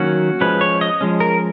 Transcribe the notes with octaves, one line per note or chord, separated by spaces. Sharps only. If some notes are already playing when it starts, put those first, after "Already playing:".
Already playing: D#3 F#3 A#3 C#4 F#4
F3 G#3 C#4 B4
C#5
D#5
F3 G#3 C#4
A#4